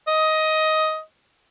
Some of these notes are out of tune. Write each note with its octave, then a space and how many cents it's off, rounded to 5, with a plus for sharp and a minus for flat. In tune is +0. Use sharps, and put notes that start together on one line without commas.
D#5 +15